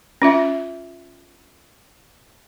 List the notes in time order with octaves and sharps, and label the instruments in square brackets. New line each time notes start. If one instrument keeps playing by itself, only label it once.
[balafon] C#4 F4 E5